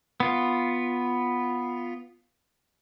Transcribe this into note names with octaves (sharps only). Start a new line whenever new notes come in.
B3 F4